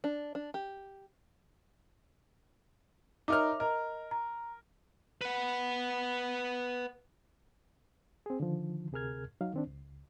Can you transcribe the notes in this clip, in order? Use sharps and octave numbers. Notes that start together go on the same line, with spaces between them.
D4
D4
G4
D#4 A#4 C#5 E5 D6 F6
A#4 D#5
A#5
B4 F#5
C4 G#4
D3 D#3 F3
D2 C3 G#4 A#4 F6 G#6
F#3 D#4 F5
D#3 C4 D4
C#2